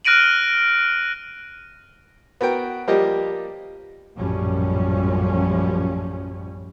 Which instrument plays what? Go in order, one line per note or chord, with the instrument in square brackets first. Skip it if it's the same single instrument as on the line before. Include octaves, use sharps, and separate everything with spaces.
[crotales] F6 F#6 A#6 D7 D#7 F#7
[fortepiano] B3 F#4 A#4 G5
F3 G3 A#3 G4 D#5
[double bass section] A#1 F#2 A2 F3 G3 C#4